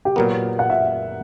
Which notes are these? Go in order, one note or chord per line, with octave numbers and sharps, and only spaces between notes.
G4
A#2 F#3 B3 A#4
F#5
E5